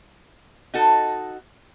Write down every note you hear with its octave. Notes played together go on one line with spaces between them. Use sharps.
D#4 F#4 A4